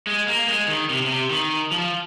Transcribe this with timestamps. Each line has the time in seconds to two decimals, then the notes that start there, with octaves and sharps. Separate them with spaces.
0.07 G#3
0.27 A#3
0.48 G#3
0.68 D#3
0.90 C3
1.05 C3
1.30 D#3
1.71 F3